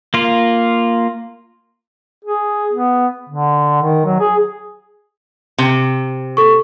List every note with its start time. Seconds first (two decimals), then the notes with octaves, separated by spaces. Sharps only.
0.14 A#3 F4
2.25 G#4
2.73 B3
3.29 D3
3.82 D#3
4.06 F#3
4.20 G#4
5.58 C3
6.37 A4 C#6